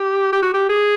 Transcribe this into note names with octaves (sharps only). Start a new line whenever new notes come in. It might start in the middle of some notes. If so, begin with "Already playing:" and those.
Already playing: G4
G4
F#4
G4
G#4